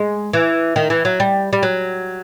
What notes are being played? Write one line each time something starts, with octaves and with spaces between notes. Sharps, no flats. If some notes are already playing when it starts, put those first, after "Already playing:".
Already playing: G#3
E3
D#3
E3
F#3
G3
G3
F#3